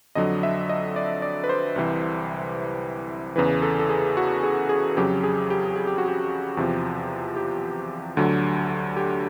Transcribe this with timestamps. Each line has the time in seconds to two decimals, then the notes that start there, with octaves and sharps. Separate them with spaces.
0.15 F2 D3 F#3 D#5
0.43 E5
0.69 D#5
0.96 D5
1.22 D5
1.44 B4
1.49 C5
1.76 C2 C3 E3
3.36 E2 C#3 E3 B4
3.62 A4
3.79 A4
3.89 G#4
4.17 F#4
4.43 G#4
4.69 G#4
4.97 F2 C#3 F#3 G4
5.24 G#4
5.50 G4
5.76 G#4
5.87 G4
5.98 F#4
6.08 G4
6.57 E2 C3 F3
7.37 G4
8.17 D2 D3 F#3
8.97 G4